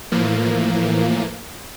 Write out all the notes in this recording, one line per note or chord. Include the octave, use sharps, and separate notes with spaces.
A2 E3 F3 A#3